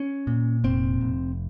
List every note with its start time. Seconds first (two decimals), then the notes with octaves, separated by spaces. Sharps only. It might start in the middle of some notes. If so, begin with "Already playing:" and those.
Already playing: C#4
0.27 A#2
0.64 F1 C4
1.01 F1